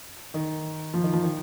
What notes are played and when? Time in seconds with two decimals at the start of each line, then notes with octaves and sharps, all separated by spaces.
0.34 D#3
0.94 F3
1.03 D#3
1.13 F3
1.23 D#3